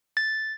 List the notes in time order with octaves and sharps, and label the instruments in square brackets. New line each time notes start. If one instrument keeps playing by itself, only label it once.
[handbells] A6